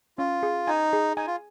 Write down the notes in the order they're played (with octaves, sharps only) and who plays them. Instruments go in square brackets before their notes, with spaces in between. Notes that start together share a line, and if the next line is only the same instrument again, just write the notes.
[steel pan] C#4 [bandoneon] F4
[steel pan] G#4
[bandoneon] D#4 [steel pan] G#5
[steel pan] G#4
[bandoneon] D#4 [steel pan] G#5
[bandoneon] F4